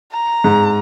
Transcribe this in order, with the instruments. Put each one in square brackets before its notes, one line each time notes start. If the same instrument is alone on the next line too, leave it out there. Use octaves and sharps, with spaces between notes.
[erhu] A#5
[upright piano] G#2